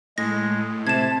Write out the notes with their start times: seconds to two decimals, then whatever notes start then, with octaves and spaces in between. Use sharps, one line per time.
0.18 A2 G#3 A#6
0.87 C3 A5 G#6 E7